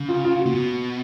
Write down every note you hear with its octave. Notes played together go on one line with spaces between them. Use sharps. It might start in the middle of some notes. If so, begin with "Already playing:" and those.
Already playing: C#3
F4
F4
F#4
A#2
B2